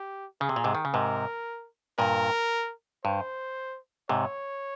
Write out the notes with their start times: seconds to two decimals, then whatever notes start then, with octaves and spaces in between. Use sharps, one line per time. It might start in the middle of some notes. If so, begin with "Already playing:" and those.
Already playing: G4
0.41 C#3 G#4
0.49 C3
0.56 A#2
0.64 G#2 C3
0.75 D#3
0.85 C#3
0.94 G#2 C3 A#4
1.99 G2 A#2 A#4
3.04 G2 C5
4.09 G#2 C3 C#5